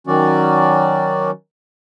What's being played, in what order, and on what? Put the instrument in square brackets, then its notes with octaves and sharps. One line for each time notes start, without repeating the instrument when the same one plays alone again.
[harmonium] D#3 F#3 C#4 F#4 D5